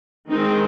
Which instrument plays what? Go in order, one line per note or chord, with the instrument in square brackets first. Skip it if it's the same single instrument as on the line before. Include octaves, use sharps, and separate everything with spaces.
[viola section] D#3 G#3 C4 D#4